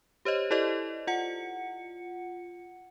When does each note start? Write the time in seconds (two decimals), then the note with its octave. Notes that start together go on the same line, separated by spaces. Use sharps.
0.25 G4 C5 C#5 D#5
0.51 E4 G4 A4 C5 D5 D#5
1.07 F4 F#5 C#7